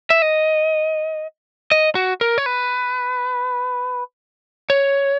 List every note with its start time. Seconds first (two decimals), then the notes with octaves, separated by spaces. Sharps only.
0.10 E5
0.22 D#5
1.71 D#5
1.95 F#4
2.21 A#4
2.38 C#5
2.46 B4
4.70 C#5